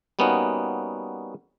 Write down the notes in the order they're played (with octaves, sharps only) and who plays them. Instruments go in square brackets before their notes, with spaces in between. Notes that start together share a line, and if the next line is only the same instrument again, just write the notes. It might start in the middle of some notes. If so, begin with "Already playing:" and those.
[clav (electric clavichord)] G3 A#3 B3 C#4 D#4 F#4